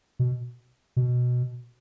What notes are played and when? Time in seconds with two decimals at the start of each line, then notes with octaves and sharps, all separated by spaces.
0.19 B2
0.97 B2